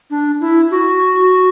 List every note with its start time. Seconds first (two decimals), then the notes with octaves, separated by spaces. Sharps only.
0.10 D4
0.41 E4
0.71 F#4